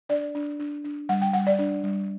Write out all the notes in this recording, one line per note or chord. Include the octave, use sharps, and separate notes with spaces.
D4 D5
D4
D4
D4
G3 F#5
G5
G3 F#5
D5
D4
G3